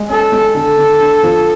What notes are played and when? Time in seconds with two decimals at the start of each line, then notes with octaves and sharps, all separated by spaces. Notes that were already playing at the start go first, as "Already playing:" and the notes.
Already playing: G#3
0.09 C#4 A4
0.32 G#3
0.55 D3 A4
0.77 D3
1.00 D3
1.23 F3